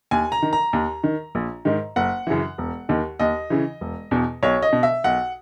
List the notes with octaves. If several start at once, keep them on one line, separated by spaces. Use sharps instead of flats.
D#2 G#5
A#5
D#3
A#5
D#2
D#3
A#1
G#2 D#3
F#1 F#5
F#2 C#3 E3
E1
D#2 D#3
D#2 D#5
C#3 E3
E1
E2 B2
B1 C#5
D#5
B2
E5
B1 F#5